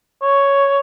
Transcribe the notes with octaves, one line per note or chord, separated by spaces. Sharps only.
C#5